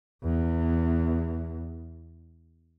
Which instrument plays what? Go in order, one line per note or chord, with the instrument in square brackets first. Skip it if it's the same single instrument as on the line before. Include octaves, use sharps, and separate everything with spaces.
[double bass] E2